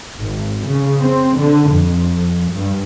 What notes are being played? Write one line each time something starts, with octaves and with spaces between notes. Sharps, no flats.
G#1
C#3
C4
D3
F2
G2